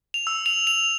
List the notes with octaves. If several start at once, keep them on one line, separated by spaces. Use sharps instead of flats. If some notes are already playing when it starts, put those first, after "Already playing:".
F7
E6
F7
F7